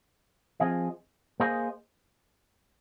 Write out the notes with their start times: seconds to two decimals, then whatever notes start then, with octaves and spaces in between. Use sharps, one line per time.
0.60 F3 C4 G#4 D#5
1.40 A#3 G#4 C5 D#5